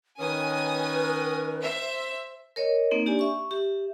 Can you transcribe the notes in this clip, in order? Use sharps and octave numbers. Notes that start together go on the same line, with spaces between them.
D#3 C#4 A#4 B4 G#5 D#6
C5 E5
A#4 C#5 D#5
A#3 C4 D#4
D4 G4 D5 G#5
E5 C#6
G4 E5